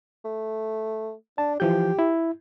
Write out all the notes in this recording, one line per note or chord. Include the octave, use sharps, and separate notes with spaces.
A3
D4 A5
E3 F3 G4 G6
E4